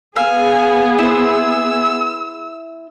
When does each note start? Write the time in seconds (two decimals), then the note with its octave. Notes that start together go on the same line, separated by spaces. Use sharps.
0.16 B3 G#4 F5 G#5 E6
0.99 E4 C5 E6